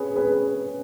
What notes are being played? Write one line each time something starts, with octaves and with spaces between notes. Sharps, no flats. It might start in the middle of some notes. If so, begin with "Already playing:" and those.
Already playing: G#4 B4 C#5
G#4 B4